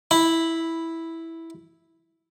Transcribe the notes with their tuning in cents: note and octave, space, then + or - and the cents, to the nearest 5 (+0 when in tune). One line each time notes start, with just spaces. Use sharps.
E4 -5 B5 +0